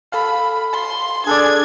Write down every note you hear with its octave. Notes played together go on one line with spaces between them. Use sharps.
A4 F5 B5
C6
D4 G#4 A4 D5 G#6